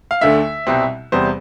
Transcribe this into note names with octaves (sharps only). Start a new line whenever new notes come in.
F5
D2 D3 A3 E5
C2 B2 G3 C4
E2 C3 G3 B3 C5